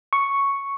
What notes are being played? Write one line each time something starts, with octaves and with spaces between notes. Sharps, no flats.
C#6